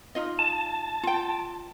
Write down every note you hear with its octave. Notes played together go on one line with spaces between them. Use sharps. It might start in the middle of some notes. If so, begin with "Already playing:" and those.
D#4 F4 D#5
A5
F4 G5